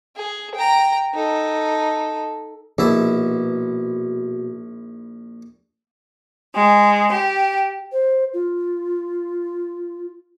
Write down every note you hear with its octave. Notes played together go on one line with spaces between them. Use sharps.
G#4
G5 A#5
D#4 A4
A#1 B2 E4 A5
G#3
G4
C5
F4